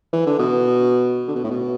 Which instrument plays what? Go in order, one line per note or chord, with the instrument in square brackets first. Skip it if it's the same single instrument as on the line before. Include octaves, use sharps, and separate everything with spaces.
[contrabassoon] E3
D3
B2
D3
B2
A2
B2